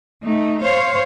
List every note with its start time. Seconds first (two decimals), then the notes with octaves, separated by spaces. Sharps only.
0.25 A3 D#4
0.61 C5 C#5 F5